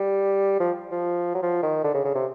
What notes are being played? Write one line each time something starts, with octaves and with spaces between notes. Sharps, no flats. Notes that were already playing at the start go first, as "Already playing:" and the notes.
Already playing: G3
F3
F3
F#3
F3
D#3
D3
C#3
C#3
C3